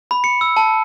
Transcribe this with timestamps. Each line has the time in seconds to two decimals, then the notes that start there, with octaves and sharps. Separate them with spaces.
0.11 B5
0.24 C#7
0.41 E6
0.57 A5